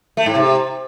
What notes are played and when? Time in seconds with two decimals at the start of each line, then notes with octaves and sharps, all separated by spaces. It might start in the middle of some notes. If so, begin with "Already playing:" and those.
0.17 A3
0.26 G#2
0.35 C3